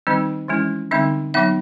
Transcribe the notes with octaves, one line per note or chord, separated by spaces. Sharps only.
D#3 G3 C4 D#4 D#5
E3 G#3 C#4 E4
D3 G3 C4 D#4 E5
F#3 B3 D#4 E5